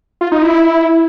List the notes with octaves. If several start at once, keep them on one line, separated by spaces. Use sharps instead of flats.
F4
D#4
E4